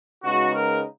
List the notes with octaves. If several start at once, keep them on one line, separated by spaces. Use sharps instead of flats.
C#3 G#3 B3 D#4 F#4
A#4